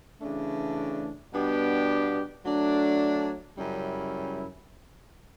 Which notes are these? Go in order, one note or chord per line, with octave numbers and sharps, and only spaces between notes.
C#3 E3 A3 D4
B2 G3 B3 D4 G4
F#3 A3 D4
F#2 C#3 G3 C#4 E4